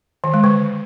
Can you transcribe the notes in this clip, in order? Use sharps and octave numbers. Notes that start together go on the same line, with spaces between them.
D#3
G#3
D3